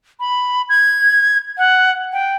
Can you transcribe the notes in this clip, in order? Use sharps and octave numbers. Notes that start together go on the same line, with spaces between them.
B5
G#6
F#5
G5